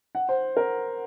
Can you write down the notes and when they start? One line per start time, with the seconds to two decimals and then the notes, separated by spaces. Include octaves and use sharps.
0.15 F#5
0.29 C5
0.57 A#4